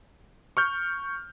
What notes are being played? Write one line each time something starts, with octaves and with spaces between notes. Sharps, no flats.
C#6 F6 G6